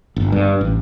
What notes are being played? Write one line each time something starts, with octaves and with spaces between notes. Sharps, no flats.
G1
G2
A1